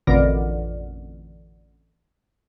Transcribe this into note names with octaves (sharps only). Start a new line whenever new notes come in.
A1 F2 B2 D3 A#4